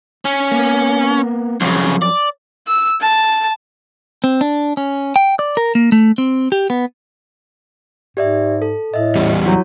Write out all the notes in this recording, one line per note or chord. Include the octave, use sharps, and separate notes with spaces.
C#4
A#3 B3
C2 F#2 C#3 F3 C#5
D5
E6
A5
C4
D4
C#4
G5
D5
A#4
A#3
A3
C4
G4
B3
G#2 G4 D5 E5
A4
A2 D#5 E5
E2 G3
F#3 E4 F#4 C#5